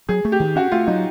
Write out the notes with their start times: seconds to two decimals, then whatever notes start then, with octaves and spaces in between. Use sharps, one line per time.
0.09 F#3 G#4
0.25 A3
0.32 G4
0.40 D#3
0.56 C#4 F#4
0.72 A3 F4
0.87 F#3 D#4